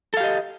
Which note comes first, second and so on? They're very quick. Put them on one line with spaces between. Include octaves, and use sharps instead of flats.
A4 F5 G4 D#5